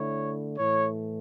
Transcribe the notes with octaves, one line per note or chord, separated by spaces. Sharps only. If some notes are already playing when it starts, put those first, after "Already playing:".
Already playing: D3 A3 E4 C#5
A2 E3 A3 C#5